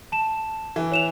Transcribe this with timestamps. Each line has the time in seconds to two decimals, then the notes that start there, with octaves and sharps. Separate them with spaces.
0.12 A5 E7
0.76 E3
0.92 C#5 E7 F7